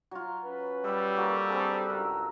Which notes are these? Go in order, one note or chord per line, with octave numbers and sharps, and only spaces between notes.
F#3 F4
C#4 B4
G3 E6
A#3 F#4 A4
C4 D4 G#4 A4 B4
C#2 G2 A#4